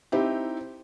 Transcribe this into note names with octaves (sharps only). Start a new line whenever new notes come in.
C4 D#4 E4 G4